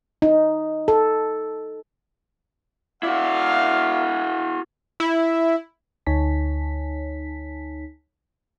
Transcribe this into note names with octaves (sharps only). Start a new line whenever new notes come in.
D#4
A4
E4 F#4 D5 E5 F5
E4
D2 D#4 C#5 G#5 A5 B6